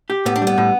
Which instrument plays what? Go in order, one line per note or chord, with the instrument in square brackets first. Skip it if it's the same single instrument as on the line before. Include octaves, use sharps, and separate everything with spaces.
[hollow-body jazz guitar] G4
[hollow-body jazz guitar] A2 [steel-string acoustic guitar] B3
[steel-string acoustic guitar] D4
[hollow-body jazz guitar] G3
[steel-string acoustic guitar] B3
[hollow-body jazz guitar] A2